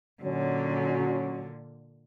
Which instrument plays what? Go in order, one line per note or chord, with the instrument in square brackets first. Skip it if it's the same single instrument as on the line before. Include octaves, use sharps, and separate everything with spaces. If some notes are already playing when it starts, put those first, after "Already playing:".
[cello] A#2 D3 [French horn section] F#3 C#4